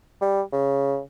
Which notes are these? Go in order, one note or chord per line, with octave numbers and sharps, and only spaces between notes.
G3
C#3